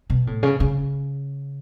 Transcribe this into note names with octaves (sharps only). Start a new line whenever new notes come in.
B2
A2
C#3
C#3